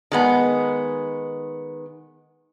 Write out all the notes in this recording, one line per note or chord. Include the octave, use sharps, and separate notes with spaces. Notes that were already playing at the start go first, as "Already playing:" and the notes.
D#3 G#3 B3